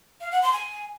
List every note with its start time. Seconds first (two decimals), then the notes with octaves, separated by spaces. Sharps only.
0.21 F5
0.31 F#5
0.42 C6
0.53 G#5